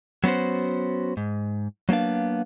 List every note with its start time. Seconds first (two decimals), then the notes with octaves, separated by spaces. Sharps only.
0.24 F#3 B3 C#4 F#4 C5
1.17 G#2
1.89 F#3 A#3 B3 D4 F5